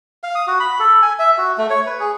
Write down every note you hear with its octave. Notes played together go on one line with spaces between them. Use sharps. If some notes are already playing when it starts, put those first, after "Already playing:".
F5
D#6
F#4
B5
A4
G#5
E5
F#4
A3
C#5
B4
G#4